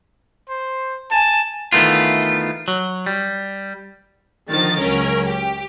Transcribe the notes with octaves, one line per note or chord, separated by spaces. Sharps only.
C5
G#5 A5
D#3 E3 A3 B3 F4
F#3
G3
D3 D#3 F3 A6
C#2 F#3 C#4 A#4
G4